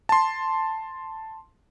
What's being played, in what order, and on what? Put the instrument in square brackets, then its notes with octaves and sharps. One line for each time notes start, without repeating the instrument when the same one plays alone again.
[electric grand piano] A5 C6